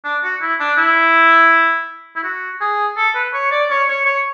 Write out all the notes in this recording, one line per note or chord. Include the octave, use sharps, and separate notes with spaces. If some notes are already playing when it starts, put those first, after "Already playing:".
D4
F#4
E4
D4
E4
E4
F#4
G#4
A4
B4
C#5
D5
C#5
C#5
C#5